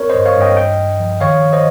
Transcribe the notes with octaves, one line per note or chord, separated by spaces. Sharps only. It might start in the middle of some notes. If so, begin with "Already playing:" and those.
Already playing: C4 A#4 C#5
G2 C5 D#5
C#5 F5
G2
D#5 G5
C2 D#5 G5
C2
F3
D#3 C#5 F5
D#3
C5 D#5